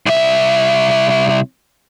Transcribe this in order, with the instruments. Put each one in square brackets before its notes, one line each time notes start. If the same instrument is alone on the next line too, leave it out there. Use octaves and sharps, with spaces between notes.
[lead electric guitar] C2 E5